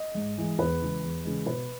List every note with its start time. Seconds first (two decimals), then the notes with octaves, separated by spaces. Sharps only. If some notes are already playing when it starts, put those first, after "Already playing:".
Already playing: D#5
0.15 G#2
0.37 E3 G#3
0.59 E2 B4
0.81 C#3 E3 G#3
1.03 E2
1.25 C#3 E3 G#3
1.46 B2 B4